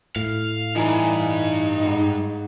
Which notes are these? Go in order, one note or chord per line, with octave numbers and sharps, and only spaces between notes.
A2 F5
G2 E3 D#4 G#5 A#5
G#2 F#5